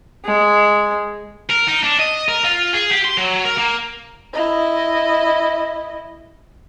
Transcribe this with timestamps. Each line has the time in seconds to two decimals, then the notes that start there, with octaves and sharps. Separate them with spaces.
0.25 G#3
1.50 A#4
1.67 D#4
1.83 D4
1.99 D#5
2.28 A#4
2.44 F4
2.73 G#4
2.91 G4
3.05 C6
3.18 F#3
3.45 A#4
3.58 A#3
4.34 E4 D#5